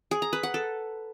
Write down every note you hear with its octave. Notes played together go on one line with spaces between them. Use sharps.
G#4
A#5
B4
F#5
A4